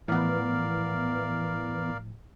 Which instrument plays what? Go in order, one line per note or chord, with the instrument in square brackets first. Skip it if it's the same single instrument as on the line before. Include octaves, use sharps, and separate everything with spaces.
[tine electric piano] A2 F3 [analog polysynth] E3 B3 [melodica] A#4 D5 F5